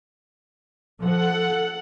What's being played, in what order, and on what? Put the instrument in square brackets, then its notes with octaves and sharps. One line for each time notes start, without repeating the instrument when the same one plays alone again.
[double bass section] F3 [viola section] A4 F#5